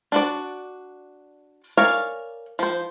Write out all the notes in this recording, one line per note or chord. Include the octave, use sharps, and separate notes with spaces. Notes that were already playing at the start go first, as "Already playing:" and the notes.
D4 F#4 D5
A#4 C#5 D5 F5 G#5
F3 C5